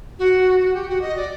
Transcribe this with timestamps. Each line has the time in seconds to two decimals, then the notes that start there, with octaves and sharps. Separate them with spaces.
0.19 F#4
0.60 F#4
0.73 G4
0.88 F#4
1.01 D#5
1.16 D5